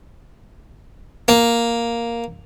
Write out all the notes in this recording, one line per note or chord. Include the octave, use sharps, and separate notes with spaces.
A#3